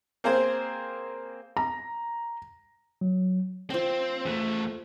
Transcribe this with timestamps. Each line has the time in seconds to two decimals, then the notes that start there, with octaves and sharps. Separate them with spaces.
0.24 A#3 C4 G#4 C5
1.57 A#5
3.01 F#3
3.70 F3 C4 G5
4.25 E2 A3